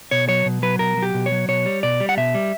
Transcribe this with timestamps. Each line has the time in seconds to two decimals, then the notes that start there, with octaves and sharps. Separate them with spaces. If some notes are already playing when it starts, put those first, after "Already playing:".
0.11 B2 C#5
0.28 F#3 C#5
0.46 B2
0.62 F#3 B4
0.79 B2 A#4
0.97 F#3
1.03 G4
1.14 B2
1.26 C#5
1.32 F#3
1.48 B2 C#5
1.66 G3
1.83 B2 D5
2.00 G3
2.09 F#5
2.17 B2 E5
2.35 G3